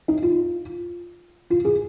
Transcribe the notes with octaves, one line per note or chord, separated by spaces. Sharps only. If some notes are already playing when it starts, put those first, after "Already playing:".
D#4
F4
F4
G#4